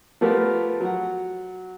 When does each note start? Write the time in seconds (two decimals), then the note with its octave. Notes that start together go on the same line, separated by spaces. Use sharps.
0.21 F3 A3 B3 G4 A#4
0.81 F#3 F#5